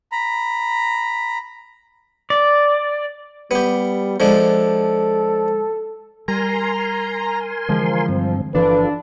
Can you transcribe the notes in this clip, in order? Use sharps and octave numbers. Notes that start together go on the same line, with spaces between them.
A#5 B5
D5
G3 B3 G4
F3 G#3 D4 A4
G3 A#4 G#5 A#5 C6
D3 E3 F3 G#3
G2 C4
G1 E3 F3 D4 F4 A4 B4